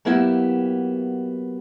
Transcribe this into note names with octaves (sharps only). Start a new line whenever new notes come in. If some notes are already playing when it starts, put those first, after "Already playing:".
F#3 A#3 B3 E4 G4 E5